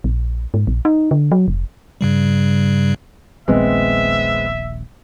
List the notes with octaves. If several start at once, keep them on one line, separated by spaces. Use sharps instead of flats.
A#1
G#2
A#1
D#4
D3
F#3
F1
G2 C#3 G3
D#1 A#1 D#2 G#3 B3 C4 E5